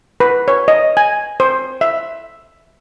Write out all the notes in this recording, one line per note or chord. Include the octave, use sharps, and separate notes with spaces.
B4
C#5
D#5
G#5
C5
E5